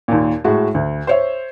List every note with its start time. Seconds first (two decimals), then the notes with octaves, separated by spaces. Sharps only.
0.08 D#2 A#2
0.44 A2 G#3 F#4
0.74 D2
1.07 C5 C#5 E5